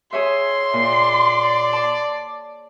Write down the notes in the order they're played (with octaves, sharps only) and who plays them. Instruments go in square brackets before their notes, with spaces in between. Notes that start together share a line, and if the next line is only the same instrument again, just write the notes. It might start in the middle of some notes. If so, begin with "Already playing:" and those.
[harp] G#4 C#5 E5 [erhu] C6
[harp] A#2 [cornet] D5
[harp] A5 D6